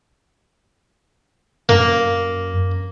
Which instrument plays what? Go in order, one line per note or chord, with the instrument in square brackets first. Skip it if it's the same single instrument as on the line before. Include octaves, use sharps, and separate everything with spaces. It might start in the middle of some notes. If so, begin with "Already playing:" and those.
[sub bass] F#2 [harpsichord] A#3